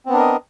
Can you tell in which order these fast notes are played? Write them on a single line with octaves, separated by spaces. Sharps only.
C4 B3 D4 A#4 D#5